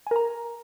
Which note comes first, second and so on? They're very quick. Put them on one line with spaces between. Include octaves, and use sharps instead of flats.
G#5 A#4 A#5